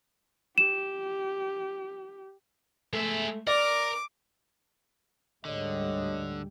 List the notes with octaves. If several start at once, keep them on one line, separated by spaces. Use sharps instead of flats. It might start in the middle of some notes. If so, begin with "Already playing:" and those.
G4 E7
G#3 A3 E5
A#4 D5 D6
D2 G#2 D3 G3 C#5 D#5